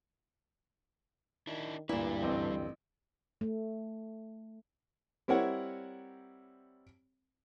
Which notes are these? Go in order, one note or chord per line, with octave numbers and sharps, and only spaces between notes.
D#3 D4 E4
D2 G2 A#2 G3 E4 B4
A1 C4
A3
G3 C4 E4 A#4 C#5 F#5